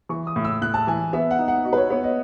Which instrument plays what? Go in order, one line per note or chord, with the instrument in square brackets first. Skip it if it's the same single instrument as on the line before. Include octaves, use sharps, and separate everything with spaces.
[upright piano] E3 [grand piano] C#6
[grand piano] D#6
[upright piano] A2
[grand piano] E6
[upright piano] A2 [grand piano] F#6
[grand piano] A5
[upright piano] E3 [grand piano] G#5
[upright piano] B3 [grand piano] E5
[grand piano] F#5
[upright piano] D#4
[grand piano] F#5
[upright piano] F#4 [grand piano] D#5
[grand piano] B4
C#5
[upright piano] B3 [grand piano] C#5
[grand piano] D#5